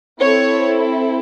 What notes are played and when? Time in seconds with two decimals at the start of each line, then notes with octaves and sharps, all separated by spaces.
0.20 C4 E4 A4 C#5